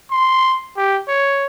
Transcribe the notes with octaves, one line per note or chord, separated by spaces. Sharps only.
C6
G4
C#5